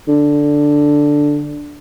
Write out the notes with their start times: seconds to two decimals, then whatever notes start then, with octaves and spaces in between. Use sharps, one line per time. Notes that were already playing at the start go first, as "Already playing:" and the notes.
0.08 D3